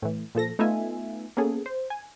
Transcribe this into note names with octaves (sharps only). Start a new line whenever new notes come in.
A2 E3
A#2 F3 A4 A#6
A3 B3 D#4 F4 E5 G#5
A#3 B3 C#4 G#4 A4
C5
G#5